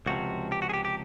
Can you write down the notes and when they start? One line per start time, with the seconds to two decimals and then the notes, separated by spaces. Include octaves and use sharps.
0.06 C#2 C3 F3 F#4
0.52 G4
0.62 F#4
0.69 G#4
0.74 G4
0.85 G4